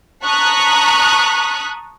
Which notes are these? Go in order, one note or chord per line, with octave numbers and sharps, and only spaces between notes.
A5 A#5 C#6 D#6 F#6 B6